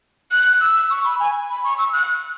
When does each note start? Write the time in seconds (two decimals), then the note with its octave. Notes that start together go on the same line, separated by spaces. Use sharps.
0.32 F#6
0.60 E6
0.90 C#6
1.05 B5
1.20 G#5
1.49 B5
1.64 C#6
1.78 E6
1.93 F#6